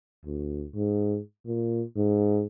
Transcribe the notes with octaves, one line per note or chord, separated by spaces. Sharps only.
D2
G#2
A#2
G#2